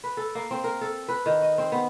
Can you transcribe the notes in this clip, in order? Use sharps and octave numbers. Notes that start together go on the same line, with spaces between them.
B4
A4
A#3
C4
A#4
A4
B4
D#3
D#5
C4
B3